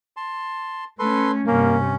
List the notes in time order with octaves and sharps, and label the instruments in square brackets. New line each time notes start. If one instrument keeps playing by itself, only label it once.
[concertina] A5 C6
[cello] A3 C#4 [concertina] A4 B4 C6
[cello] G2 C3 [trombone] A#3 [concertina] C#4